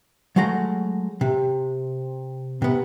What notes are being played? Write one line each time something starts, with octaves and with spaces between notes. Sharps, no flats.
F#3 G#3 A3 F#5 A#5
C3
C3 B3